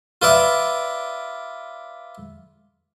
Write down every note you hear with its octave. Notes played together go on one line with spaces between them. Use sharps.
F4 B4 D5 E5